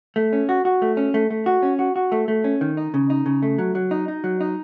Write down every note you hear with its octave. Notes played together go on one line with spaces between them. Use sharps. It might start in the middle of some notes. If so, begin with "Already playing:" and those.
A3
C#4
F#4
F#4
A3
C#4
A3
A3
F#4
C#4
F#4
F#4
A3
A3
C#4
D#3
D#4
C#3
D#4
C#3
A3
F#3
F#3
D#4
D#4
F#3
D#4